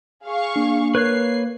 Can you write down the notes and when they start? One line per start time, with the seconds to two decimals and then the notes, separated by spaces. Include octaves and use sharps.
0.25 G#4 F5 C#6
0.56 A#3 D4
0.95 A#4 B4 C#5 F#6 C7